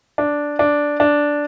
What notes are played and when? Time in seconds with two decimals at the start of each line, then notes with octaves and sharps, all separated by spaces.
0.18 D4
0.59 D4
1.00 D4